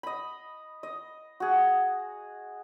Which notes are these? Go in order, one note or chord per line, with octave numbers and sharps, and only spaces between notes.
D#5 B5
D#5
F#4 G#4